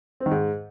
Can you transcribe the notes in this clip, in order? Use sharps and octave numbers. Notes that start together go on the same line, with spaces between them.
C4
D#3
G#2